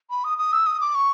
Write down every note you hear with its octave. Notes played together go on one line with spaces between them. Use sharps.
B5
D#6
D#6
E6
D#6
D6
C#6